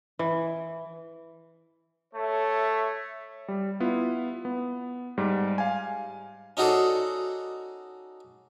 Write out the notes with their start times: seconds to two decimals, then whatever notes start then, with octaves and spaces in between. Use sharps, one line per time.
0.19 E3
2.14 A3 C#5 E5
3.48 G3
3.80 B3 E4 F4
4.45 B3
5.17 G#2 G3
5.58 F5 G#5
6.57 C#4 D#4 F#4 G#4 A4 D5